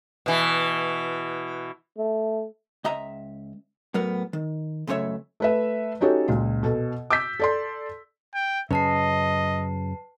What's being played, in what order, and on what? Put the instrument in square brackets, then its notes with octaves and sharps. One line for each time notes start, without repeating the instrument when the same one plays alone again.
[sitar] B2 E3
[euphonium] A3
[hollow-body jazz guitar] C#2 D#5 E5 A#5
A2 F#3 B3 A#4
D#3
C#2 F#2 C#3 A3 C#5 E5
[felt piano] A3 B4 E5
C#4 D#4 F#4 G4 A4 C#5
C#2 A#2
B2 A4
D6 E6 G6 B6
A4 D5 C6
[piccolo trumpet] G5
[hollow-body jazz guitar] F#2 C#3 [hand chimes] B4 A5 C7 [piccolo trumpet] D#5